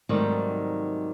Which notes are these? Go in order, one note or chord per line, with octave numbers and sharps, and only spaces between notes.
G#2 C3 D#3 F#3 G3 A3